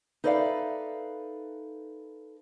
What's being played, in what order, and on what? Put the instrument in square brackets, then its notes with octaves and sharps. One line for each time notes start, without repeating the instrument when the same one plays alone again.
[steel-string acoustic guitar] D#4 A4 B4 D5 E5 F5